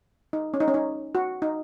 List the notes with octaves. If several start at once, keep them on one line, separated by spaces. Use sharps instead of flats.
D#4
C#4
D#4
C#4
D#4
F#4
D#4